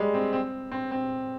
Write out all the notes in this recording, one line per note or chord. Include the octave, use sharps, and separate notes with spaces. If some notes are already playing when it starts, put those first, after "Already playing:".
Already playing: G3 G#3
C4
C4
C4
C4